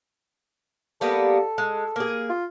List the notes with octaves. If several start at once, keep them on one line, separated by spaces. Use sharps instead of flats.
G3 A#3 B3 A4
G#3
A#3 G#4
F4